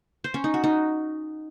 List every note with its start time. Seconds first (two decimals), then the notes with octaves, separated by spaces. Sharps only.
0.24 C5
0.34 C#4
0.44 D#4
0.54 F#4
0.64 D#4